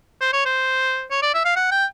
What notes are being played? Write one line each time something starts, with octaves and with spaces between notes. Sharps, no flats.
C5
C#5
C5
C#5
D5
E5
F5
F#5
G5